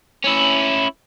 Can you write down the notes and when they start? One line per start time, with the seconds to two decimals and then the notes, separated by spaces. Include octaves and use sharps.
0.24 C#4 E4